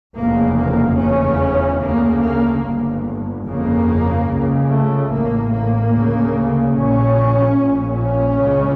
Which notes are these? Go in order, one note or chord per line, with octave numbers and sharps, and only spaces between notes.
F1 E2 C#3 A#3
A#3
F1 E2 C#3 C#4
D2 C#3 A#3
A#3
G1 G2
G1 F2 C#3 A#3
C#2 C#3
A3
A1 A2 A#3
A#3
D2 C#3
A#1 A#2 C#4
A#1 A#2
C#4
C#2 C#3